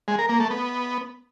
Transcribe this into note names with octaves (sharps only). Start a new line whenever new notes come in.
G#3
A#4
A#3
A3
B3